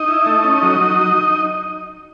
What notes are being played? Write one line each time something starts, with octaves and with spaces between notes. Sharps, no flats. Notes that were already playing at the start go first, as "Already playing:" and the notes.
Already playing: D#4 D#5
E4
A3
C#4
F#3
F#3